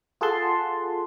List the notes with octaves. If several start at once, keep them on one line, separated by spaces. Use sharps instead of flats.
F4 G#4 A4 F#5 A5 C6